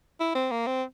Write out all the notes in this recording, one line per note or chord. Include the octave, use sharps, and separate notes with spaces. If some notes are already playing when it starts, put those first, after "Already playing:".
E4
C4
A#3
C4